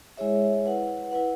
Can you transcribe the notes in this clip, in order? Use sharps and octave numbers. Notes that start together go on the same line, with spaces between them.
G#3 E4 G#4 C#5 E5
E4 B4 F#5
E4 B4 F#5